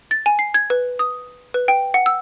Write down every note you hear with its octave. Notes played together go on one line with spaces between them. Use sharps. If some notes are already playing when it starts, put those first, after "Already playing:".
A6
G#5
C7
G#6
B4
D#6
B4
G5
F#5
E6